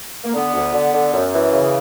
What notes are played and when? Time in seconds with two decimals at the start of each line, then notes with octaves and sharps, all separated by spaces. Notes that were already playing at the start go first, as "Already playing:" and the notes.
0.24 A#3
0.34 D3 B3
0.54 D2
0.74 D3
0.93 D3
1.14 F#2
1.33 E3
1.53 C#3